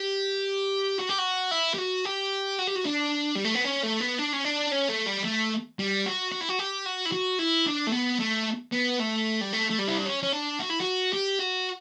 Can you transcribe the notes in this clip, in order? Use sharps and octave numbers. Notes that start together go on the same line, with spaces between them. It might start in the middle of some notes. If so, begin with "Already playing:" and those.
Already playing: G4
F#4
G4
F#4
E4
G4
F#4
G4
F#4
G4
F#4
D4
G3
A3
B3
C#4
A3
B3
D4
C#4
D4
C#4
A3
G3
A3
G3
F#4
F#4
E4
F#4
G4
F#4
E4
F#4
E4
D4
A3
B3
A3
B3
A3
G3
A3
A3
G3
E4
D4
C#4
C#4
D4
F#4
E4
F#4
G4
F#4